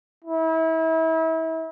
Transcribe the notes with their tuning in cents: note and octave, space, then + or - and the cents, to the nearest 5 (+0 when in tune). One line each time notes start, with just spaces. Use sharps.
E4 -35